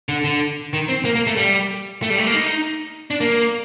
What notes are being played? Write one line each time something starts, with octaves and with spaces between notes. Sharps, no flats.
D3
D3
D#3
C4
A#3
A#3
A3
G3
A3
G3
A3
A#3
D#4
D4
A#3